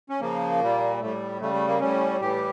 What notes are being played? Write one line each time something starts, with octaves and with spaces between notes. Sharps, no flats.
C#4
C#3 F3 A#3
A#2 G3
A2 G3 A3
C#3 G3 A3
A3
A#3
A2 G3 C#4
A2 E3 G3 G4